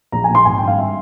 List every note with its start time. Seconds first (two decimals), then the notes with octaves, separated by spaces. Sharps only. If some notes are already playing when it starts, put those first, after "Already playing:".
0.12 A#1 A#5
0.24 G#5
0.30 A#1
0.35 C6
0.45 G#1 G#5
0.57 G5
0.62 G2
0.68 F5
0.79 E5